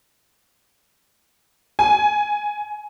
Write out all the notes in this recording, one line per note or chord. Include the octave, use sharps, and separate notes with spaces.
G#5